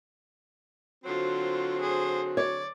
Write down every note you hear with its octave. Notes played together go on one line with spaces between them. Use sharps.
D3 F#3 C4 F4 F#4 C5
G#4 C5
C#5 D5